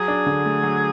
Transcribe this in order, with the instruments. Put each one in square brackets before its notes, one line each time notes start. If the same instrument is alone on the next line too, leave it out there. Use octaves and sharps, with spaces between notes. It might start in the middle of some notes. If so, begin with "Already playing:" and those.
Already playing: [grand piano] F#3 [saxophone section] G#4
[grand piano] D4
D3
A3
F#3